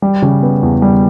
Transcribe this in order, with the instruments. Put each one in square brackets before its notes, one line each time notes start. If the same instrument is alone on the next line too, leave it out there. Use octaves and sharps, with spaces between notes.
[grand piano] G3
C#3
B3
E2
G3